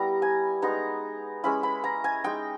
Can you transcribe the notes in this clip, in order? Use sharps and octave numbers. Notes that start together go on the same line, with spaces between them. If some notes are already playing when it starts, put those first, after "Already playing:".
Already playing: G3 B3 E4 A#5
G#5
G#3 B3 D#4 A#5
G#3 C#4 E4 B5
B5
A#5
G#5
G#3 D#4 G5